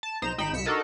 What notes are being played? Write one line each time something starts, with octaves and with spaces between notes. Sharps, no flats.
A5
B1 D#4 C5 A#5 E7
G#1 D#4 G5 B5 E7
C2 B6 C#7 E7
D4 D#4 F#4 A4 A#4 D#5